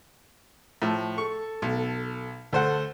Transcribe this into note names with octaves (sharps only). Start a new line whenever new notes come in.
A2 F3
A4 C#6
B1
D2 A4 C5 F#5